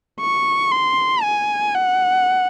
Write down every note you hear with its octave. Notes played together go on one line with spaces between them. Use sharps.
C#6
C6
G#5
F#5